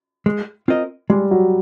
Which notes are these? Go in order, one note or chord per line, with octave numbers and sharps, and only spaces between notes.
G#3
C4 F4 A#4 D#5
G3 G#3
F#3